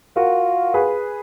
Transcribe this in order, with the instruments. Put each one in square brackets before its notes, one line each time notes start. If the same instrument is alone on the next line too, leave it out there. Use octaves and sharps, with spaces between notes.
[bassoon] F4 [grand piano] F#4 A#4
[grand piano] G#4 B4